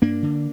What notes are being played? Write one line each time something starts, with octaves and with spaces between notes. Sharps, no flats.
G2 A#3 D4
D3